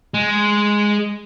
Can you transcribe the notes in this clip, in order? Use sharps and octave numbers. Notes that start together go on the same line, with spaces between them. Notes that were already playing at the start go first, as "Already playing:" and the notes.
G#3